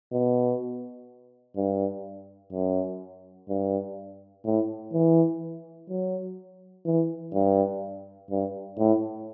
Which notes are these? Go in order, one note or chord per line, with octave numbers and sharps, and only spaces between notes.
B2
G2
F#2
G2
A2
E3
F#3
E3
G2
G2
A2